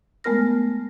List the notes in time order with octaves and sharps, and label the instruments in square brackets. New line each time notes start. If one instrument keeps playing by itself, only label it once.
[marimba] G#3 A3 B3 A#4 F6 A#6